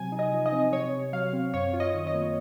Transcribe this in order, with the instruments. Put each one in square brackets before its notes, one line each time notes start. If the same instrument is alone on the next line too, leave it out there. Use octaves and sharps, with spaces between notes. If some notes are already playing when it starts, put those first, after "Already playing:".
Already playing: [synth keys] C3 F#3 G#5
D#4
D#5
F3
D#5
C4
C3 C#5
C3
F#3 F5
C4
F#2 C#5
F4
D#5
D#3
D#5
A#3